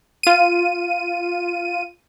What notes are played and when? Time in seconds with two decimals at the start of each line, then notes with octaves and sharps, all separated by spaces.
0.23 F4 D#7